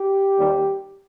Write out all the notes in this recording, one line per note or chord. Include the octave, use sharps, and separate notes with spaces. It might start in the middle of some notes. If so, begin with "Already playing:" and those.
Already playing: G4
D#2 D#3 G3